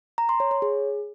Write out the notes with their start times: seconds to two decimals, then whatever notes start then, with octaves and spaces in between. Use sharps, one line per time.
0.18 A#5
0.29 C6
0.40 C#5
0.51 C#5
0.62 G#4